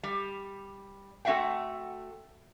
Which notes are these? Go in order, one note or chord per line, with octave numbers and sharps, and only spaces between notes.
G3
A3 C4 F#4 E5 F#5 G5